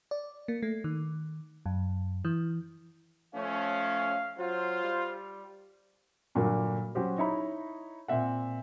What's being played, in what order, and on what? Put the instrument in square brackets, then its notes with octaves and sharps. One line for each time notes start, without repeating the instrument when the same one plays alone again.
[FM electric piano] D5
A#3
A3
D#3
F#2
E3
[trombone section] F3 A3 C#4 [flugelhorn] F5
[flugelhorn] F#3 [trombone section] F4 C5
[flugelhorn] G3
[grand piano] G2 A#2 D3 F#3 A#3
F#3 C#4 F#4 G4 C5
D#4 E4 C#5 A#5 B5
A#2 C4 E5 F#5